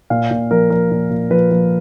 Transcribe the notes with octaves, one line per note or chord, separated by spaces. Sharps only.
A#2 F5
A#2
F3 A#4
F3 A#4
A#2
A#2
F3 B4
F3